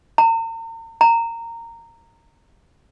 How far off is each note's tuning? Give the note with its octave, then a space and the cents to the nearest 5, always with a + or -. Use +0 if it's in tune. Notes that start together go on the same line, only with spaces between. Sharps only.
A#5 -40
A#5 -15